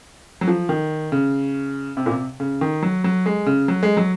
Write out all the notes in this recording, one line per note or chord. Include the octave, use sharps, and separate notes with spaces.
F#3
F3
D#3
C#3
C3
A#2
C3
C#3
D#3
F#3
F#3
G#3
C#3
F#3
G#3
F#3